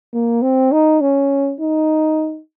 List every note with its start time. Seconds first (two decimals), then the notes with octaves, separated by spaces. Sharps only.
0.13 A#3
0.42 C4
0.72 D#4
1.01 C#4
1.60 D#4